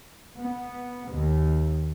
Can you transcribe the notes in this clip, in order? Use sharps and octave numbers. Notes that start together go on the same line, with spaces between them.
B3
D#2